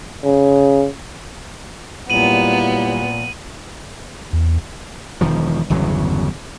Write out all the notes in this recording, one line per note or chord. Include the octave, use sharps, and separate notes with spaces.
C#3
A#2 F#3 G3 B3 E4 D#7 F#7
E2
E1 D#3 F3
G1 E2 C#3 F#3